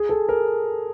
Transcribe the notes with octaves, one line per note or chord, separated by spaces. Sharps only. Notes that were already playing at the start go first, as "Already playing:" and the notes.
Already playing: G#4
A4
A#4